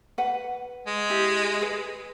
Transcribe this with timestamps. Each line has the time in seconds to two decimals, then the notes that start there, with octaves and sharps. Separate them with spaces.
0.18 B4 F#5
0.87 G#3
1.10 E4 G4
1.61 G#4 B4